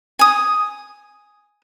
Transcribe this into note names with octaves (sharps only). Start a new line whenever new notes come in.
G#5 D#6